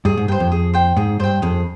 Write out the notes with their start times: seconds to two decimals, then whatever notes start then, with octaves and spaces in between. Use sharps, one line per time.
0.05 G2 G#4
0.17 G#2
0.28 G2 C5 G5
0.40 F2
0.52 G#4
0.74 C5 G5
0.96 G#2 G#4
1.20 G2 C5 G5
1.42 F2 G#4